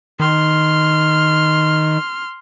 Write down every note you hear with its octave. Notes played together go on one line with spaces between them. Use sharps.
D#3 C6 F6